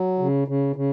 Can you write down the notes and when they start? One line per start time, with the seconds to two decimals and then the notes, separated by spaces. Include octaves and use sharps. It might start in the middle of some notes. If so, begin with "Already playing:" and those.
Already playing: F#3
0.19 C#3
0.48 C#3
0.76 C#3